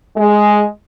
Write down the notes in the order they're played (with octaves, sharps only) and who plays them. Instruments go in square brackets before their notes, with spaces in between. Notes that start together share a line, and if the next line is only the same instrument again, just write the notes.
[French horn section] G#3